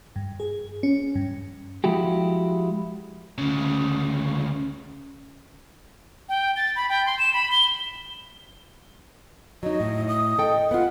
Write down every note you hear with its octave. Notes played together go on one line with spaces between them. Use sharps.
G2
G#4
C#4
G2
F3 G#3 E4 F#4 G4
D2 C#3
G5
A6
B5
G5
C6
E7
B5
G7
F#3 D#4 D#5
A2
D#6
A4 D#5 G5
B3 F4 F#5